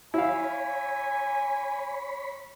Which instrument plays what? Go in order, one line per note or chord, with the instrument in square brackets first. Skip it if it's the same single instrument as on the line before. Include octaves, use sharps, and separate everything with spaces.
[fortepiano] E4 F5 [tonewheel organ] C#5 B5 [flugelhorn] G#5